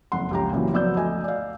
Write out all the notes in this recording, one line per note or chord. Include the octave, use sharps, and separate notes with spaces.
F#1 F2 F#5 C6
C#2 G4 A#5
A#2 C#3 E3 F#3
F3 F#3 B3 D5 E6 G6
D2 D#5 G#5
D5 F5